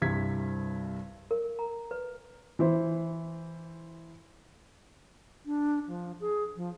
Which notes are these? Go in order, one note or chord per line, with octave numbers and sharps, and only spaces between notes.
C2 G2 C3 C4 G#6 B6
A#4
A#5
B4
E3 E4 C5
D4
F3
G#4
F3